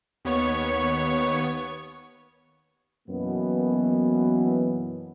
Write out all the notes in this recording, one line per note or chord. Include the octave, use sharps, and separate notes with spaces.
D#2 B3 C#5 C#6
F#2 B2 E3 A#3 B3